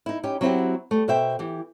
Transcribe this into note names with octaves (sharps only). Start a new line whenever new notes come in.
D#4 E4
C#4 D#4 G4
F#3 C4 D4 E4 F#4 G4
G3 A3
B2 C5 E5 G5
E3 G4